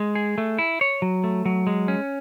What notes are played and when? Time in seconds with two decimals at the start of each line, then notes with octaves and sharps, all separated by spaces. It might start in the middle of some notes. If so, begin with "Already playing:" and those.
Already playing: G#3
0.15 G#4
0.38 A3
0.59 E4
0.81 C#5
1.02 F#3
1.24 A3
1.46 F#3
1.67 G#3
1.88 C#4